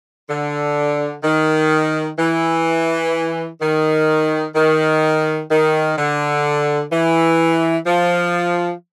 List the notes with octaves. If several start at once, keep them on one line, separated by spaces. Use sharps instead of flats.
D3
D#3
E3
D#3
D#3
D#3
D3
E3
F3